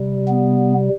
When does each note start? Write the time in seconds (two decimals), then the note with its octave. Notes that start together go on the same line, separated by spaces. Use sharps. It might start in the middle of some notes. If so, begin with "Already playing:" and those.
Already playing: C3 G3
0.29 B3